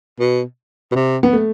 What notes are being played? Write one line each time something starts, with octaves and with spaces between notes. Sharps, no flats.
B2
B2
C3
B3
A3